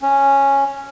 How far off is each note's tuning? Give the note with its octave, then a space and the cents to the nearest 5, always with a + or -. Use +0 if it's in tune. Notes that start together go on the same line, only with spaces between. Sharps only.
C#4 -5